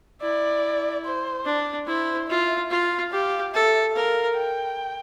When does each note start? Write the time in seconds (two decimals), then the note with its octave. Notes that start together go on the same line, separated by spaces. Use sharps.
0.22 E4 D5
1.05 C5
1.46 D4
1.88 E4 C5
2.30 F4 E5
2.71 F4 F5
3.12 G4 F5
3.54 A4 E5
3.96 A#4 F5
4.37 G5